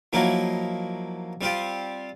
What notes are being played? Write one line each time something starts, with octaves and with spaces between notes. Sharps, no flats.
F3 F#3 A#3 D#4 E4
G3 C4 F4 G4